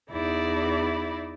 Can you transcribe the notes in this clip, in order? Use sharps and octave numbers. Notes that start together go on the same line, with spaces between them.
E2 D#4 E4 D5